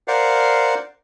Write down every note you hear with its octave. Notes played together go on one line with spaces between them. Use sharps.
A#4 C5 D5 F5 F#5